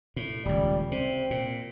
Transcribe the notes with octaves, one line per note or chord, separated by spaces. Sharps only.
A2
D#1 C#2 G3
C3 C4
A#2